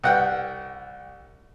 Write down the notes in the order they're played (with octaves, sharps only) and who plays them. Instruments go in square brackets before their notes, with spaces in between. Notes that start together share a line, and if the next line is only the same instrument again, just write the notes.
[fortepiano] C2 F#5 G5